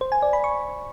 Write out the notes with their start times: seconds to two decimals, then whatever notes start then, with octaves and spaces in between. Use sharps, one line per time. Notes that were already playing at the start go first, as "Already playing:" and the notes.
0.01 C5
0.12 G#5
0.22 D5
0.33 B5
0.44 C#6